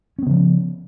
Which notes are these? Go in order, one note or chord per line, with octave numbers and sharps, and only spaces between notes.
C#3 F3 B3 C#4